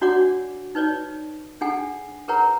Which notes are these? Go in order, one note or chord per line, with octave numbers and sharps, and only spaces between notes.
D4 F#4 C#5 D5 F#5 D6
D#4 B4 C#5 D5
D4 G#4 A4 F#5 G#5
G#4 A#4 B4 C#5 F#5 A#5